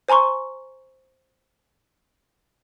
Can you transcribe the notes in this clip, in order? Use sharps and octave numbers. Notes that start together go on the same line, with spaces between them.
C5 G#5 A#5 C6 C#6